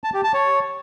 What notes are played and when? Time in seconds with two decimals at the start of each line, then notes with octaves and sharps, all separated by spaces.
0.04 A5
0.14 G4
0.24 A5
0.34 C#5